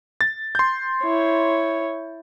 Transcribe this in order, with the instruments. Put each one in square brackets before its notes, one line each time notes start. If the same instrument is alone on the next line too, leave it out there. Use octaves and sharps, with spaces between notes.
[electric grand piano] A6
C6 G6
[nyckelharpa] E4 C#5